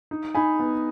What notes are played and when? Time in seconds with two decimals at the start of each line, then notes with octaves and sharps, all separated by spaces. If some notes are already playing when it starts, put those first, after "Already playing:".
0.11 D#4
0.35 D#4 G#5 B5
0.59 B3